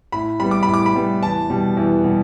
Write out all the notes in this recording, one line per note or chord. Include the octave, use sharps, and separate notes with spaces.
A2 B5
G3 B3 B5
D6
A2 B5
D6
B5
G3 B3
E2 A5
B2 G3 B3
E2
B2 G3 B3